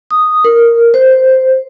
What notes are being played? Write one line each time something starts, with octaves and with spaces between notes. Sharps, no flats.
D#6
A#4
C5